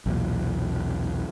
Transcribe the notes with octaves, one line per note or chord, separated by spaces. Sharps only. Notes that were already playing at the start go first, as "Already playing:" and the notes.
B1 E2 A#2